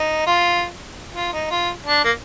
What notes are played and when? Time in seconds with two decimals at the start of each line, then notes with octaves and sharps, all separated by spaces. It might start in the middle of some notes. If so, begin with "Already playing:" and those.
Already playing: D#4
0.27 F4
1.15 F4
1.33 D#4
1.51 F4
1.86 D4
2.04 A#3